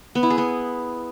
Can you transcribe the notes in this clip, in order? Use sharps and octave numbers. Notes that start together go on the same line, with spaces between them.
B3
E4
G#4
B3